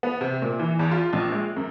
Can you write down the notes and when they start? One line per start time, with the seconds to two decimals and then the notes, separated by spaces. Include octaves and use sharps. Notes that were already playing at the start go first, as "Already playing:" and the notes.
0.03 B3
0.21 C3
0.42 A#2
0.59 E3
0.79 E2
0.91 F4
1.13 A#1
1.32 G#3
1.56 F#2